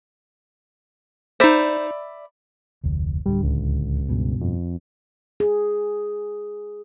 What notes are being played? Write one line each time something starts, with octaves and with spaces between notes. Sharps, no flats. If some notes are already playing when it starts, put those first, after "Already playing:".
D#4 C5 D5 E5 B5
F1 D2
D1 D3 G3
C#2
G2 B2
F2
G#4